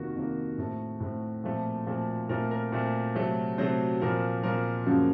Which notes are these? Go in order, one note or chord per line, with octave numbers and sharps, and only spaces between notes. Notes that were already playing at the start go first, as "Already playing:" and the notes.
Already playing: F2 C3 D#3 A#3 F#4
F2 C3 D#3 A#3
A2 A3 C4
A2 A3 C4
A#2 F3 A3 C4
A#2 F3 A3 C4
A#2 A3 C4 A#4
A#4
A#2 A3 C4
C3 F#3 A3 C4
C3 F#3 A3 C4 C5
A#2 F3 C4 A#4
A#2 F3 C4 A#4
F#2 C#3 F3 A#3